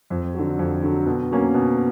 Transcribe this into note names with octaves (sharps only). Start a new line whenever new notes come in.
F2
D3 F#3
F2
D3 F#3
B2
F#3 A#3 C#4
B2